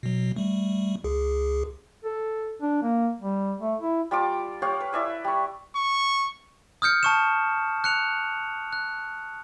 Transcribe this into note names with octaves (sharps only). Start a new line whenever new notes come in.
B2 F#3
G3 A3
C#2 G#4
A4
D4
A#3
G3
A3
E4
G3 F4 A5 D6
G4 C#5 F5 F#5
B4
E4 D5 E5 G#5
G3 C#6
C#6
D#6 F6 G6 C#7
A5 C#6 E7
F#6 C#7 F7
F#6